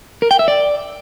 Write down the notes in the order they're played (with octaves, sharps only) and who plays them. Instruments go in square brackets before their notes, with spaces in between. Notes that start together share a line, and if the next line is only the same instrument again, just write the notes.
[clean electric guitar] A#4
G5
E5
D5